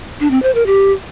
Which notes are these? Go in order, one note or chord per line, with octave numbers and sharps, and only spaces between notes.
D4
C4
C5
A#4
G4